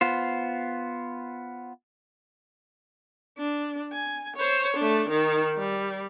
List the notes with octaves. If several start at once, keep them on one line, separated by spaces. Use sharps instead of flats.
B3 F4 C5
D4
G#5
C5 C#5
A3 D4
D#3 D#4
G3